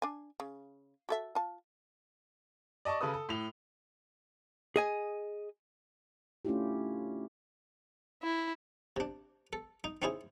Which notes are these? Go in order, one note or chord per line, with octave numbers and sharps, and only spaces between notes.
D4 G#5
C#3
F#4 A4 E5
F4 A5
D5 D#5 A5 C#6
C#3 A4 B4 D#6
A4
A2 F7
G#4 D#5 G#5
A3 C#4 D4 E4 F4 G4
E4
C3 D4
A4
D#4
C4 C#4 D#4 E4 G#4